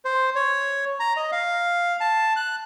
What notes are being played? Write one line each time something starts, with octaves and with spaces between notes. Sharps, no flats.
C5
C#5
A#5
D#5
F5
A5
F#6